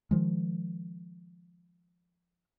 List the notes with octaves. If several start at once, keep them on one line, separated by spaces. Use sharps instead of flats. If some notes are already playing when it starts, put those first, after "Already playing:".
D#3 F3 G#3